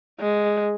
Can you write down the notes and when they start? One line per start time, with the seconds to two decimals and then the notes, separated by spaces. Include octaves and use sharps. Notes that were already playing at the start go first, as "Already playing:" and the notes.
0.20 G#3